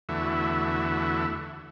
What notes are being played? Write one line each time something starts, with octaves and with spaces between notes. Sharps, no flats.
E2 D3 E3 A3 F#4 E5